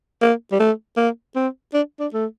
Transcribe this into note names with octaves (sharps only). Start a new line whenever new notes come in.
A#3
G3
A3
A#3
C4
D4
D4
A3